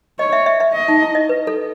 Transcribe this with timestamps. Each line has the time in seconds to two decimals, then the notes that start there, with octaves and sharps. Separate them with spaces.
0.19 C#5 D#5
0.33 E5
0.46 E5
0.60 E5
0.74 D#5
0.88 D#4
1.02 E4
1.15 D#5
1.29 B4
1.47 A4